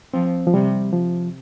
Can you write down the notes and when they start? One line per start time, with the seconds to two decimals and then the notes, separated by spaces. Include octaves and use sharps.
0.14 F3 C4
0.47 F3
0.54 C3 G3
0.93 F3